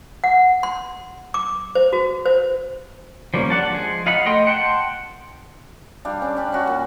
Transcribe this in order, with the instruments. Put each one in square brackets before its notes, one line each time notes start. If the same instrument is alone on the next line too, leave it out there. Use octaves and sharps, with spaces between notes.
[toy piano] F#5
C6
D6
C5
F#4
C5
[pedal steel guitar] F3 G3 A#3 C#4
D4 D5 F#5 A5
F3 G#3 G#4
F4 D#5 F5 F#5 B5
A3 D#5 G5 C6
F#5 G5 A5 C6
[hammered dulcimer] G3 D4 G4 F5
C#4 D4
D4 G4 B5
C#4 F#4
A#2